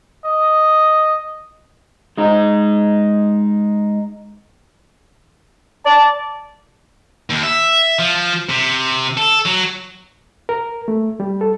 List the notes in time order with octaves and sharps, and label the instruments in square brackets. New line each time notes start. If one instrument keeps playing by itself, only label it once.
[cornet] D#5
[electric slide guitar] G#3 D#4
[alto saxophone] D5 [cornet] A5
[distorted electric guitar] D#2
E5
F3
C3
A4
F#3
[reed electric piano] A#4
A3
G3
A4